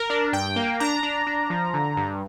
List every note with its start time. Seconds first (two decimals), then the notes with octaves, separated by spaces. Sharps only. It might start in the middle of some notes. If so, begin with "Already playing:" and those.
Already playing: A#4
0.10 D4
0.33 G2 G5
0.56 A#3
0.80 D4 A#5
1.03 D4
1.27 D4
1.50 F3
1.74 D3
1.97 G2